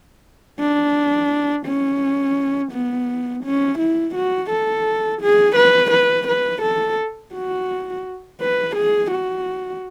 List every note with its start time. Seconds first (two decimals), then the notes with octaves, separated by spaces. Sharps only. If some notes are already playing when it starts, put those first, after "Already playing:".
0.60 D4
1.66 C#4
2.72 B3
3.44 C#4
3.79 E4
4.15 F#4
4.50 A4
5.22 G#4
5.56 B4
5.92 B4
6.28 B4
6.62 A4
7.34 F#4
8.41 B4
8.76 G#4
9.11 F#4